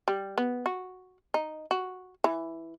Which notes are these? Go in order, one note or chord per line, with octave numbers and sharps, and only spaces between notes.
G3
B3
F#4
D#4
F#4
E3